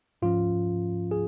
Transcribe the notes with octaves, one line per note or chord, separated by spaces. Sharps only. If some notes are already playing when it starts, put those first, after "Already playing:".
G#2 F3 C#4 F4
G#4